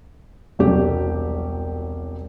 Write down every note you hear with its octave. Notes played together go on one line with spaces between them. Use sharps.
E1 C2 F#3 G4